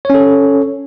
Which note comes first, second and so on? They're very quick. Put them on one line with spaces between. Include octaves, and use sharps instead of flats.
C#5 C#4 A4